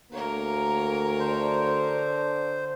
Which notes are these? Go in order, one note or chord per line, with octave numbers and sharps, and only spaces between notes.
D2 A#3 A#4 C#5
D3 C5